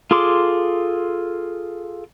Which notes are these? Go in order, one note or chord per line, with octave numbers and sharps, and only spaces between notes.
F4 G#4 A4 C6 D6